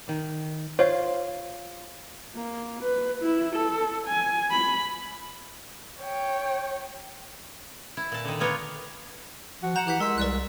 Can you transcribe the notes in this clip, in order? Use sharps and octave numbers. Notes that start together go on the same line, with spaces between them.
D#3
F4 C5 C#5 F5
A#3
B4
E4
A4
G#5
B5
C#5 G5
E4
A#2 A5
D3 D#3
A#3 B3 F4 C#5
F3 F#4
F#5 A#5 G6 E7
E3 G4 G6 B6
G#3 A#4 C6 E6 B6
C2 B4 D5 F#6